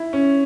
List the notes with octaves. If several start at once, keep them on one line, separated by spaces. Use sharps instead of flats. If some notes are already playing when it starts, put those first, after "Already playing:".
Already playing: E4
C#4